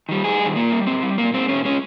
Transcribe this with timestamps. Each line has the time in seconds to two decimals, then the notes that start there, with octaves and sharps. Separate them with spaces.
0.09 D#3 G3
0.24 G2 G#4
0.40 G3
0.45 D#3
0.56 A#2 A#3
0.72 G3
0.87 A#2 C4
1.03 G3
1.18 A#2 A#3
1.34 G#3 C4
1.49 A#2 C#4
1.65 G#3 C#4